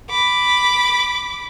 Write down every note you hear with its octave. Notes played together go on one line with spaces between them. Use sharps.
B5 D6